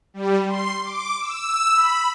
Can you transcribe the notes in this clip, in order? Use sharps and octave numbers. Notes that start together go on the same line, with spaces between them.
G3
C6
D6
E6
B5